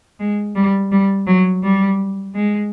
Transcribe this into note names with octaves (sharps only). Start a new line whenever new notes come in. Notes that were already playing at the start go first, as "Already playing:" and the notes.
G#3
G3
G3
F#3
G3
G#3